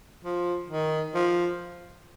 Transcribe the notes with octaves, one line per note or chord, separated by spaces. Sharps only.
F3
D#3
F3